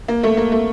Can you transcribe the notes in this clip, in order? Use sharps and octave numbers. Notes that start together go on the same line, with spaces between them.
A#3
A3
A#3
A3